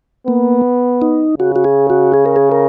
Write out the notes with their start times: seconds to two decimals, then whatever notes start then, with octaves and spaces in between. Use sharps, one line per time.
0.27 A#3 B3
1.02 D#4
1.39 C#3 F#4
1.56 F#4
1.64 G#4
1.90 F#4
2.14 G#4
2.26 A#4
2.36 G#4
2.52 A#4